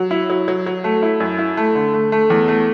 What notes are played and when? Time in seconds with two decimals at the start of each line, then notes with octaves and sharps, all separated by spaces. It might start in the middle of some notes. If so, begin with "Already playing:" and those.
Already playing: F#3
0.11 E4
0.30 F#3
0.48 F#3
0.66 F#3
0.84 A3
1.02 E4
1.20 F#2
1.39 E4
1.57 A3
1.75 D3
1.94 A3
2.12 A3
2.30 E2
2.48 A3